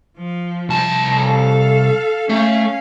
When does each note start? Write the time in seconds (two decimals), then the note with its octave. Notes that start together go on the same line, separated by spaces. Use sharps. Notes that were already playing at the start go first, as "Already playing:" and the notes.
0.17 F3
0.69 C2 A5
1.18 A4 F5
2.29 A3 C#4 F5